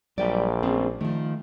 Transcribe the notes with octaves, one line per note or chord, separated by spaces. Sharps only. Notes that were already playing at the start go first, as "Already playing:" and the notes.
A#1 F#3 G3 D5 G5
A3 C4 C#4 G#4
D#3 F3 A3